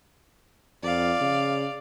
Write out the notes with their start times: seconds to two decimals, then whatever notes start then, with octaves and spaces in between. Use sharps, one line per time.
0.83 F2 D5 F5
1.21 C#3